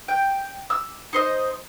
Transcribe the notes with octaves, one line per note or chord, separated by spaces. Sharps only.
G5
E6
D#4 C5 D#5